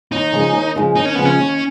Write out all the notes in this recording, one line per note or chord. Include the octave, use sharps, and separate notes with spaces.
D#2 D#4
C#3 F3 G#3
D#2
C#3 F3 G#3
D#2 D#4
C#4
C#3 F3 G#3 B3
C#4
D#2